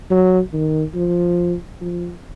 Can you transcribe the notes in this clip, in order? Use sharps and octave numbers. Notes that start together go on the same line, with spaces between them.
F#3
D#3
F3
F3